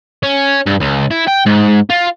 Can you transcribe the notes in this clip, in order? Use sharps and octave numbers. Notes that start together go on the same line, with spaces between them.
C#4
G2
C#2
E4
G5
G#2
F4